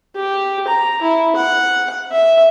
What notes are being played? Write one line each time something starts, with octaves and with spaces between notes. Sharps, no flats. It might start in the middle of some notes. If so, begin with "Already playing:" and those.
G4
A#5
E4
F#5
E5